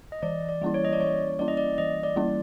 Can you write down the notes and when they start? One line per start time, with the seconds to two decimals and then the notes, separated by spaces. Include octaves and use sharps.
0.12 D#5
0.22 E3 D5
0.49 D5
0.62 G3 A#3 C#4 E4
0.74 C#5
0.85 D#5
0.93 D5
1.00 E3 C#5
1.39 G3 A#3 C#4 E4 D5
1.48 D#5
1.57 D5
1.78 E3 D#5
2.03 D5
2.16 G3 A#3 C#4 E4